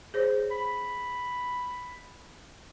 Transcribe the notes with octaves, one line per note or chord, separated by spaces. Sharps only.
G#4 C5 C#5
B5